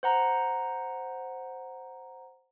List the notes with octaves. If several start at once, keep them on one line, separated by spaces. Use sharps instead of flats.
C5 F#5 A#5